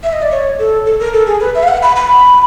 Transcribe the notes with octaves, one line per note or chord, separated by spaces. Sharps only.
E5
D#5
D5
C#5
A4
A4
A#4
A4
G#4
B4
E5
F5
F#5
B5
B5